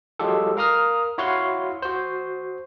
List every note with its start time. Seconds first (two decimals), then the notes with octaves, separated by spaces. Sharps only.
0.19 F#3 G#3 F4 G4 A4
0.57 A#4 F5 A#5 D#6 F6
1.18 E4 F#4 C#5 F5 F#5 C6
1.82 F#4 C5